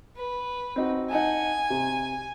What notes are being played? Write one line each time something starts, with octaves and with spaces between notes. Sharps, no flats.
B4
C4 D#4 F#4
D#4 F#5 G#5 A5
C3